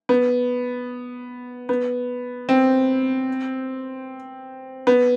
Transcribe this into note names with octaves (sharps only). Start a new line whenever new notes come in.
B3
B3
C4
B3